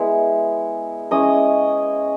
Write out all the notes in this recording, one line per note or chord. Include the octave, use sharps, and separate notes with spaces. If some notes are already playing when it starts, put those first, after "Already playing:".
Already playing: G#3 B3 E4
G#3 C#4 E4 D#5 D#6